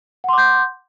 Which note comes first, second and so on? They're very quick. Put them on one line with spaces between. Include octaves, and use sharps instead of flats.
F#5 C6 D6 G6